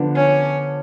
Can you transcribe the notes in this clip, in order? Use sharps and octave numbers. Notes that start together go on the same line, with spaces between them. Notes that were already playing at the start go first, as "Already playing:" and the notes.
Already playing: D3 F3 B3 D4
C#4